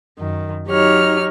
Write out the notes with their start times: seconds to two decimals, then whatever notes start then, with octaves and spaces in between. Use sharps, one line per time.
0.19 F#2 D#3
0.68 F#3 D#4 G4 C#5 F6